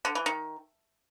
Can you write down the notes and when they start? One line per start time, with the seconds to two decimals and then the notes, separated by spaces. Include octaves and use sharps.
0.05 D3
0.15 E3
0.26 D#3